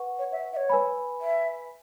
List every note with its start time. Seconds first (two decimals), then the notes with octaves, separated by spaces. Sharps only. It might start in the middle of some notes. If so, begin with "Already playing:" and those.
Already playing: B4 F#5 C#6
0.19 C#5
0.32 E5
0.53 E5
0.57 C#5
0.70 B4 G#5 B5
1.21 E5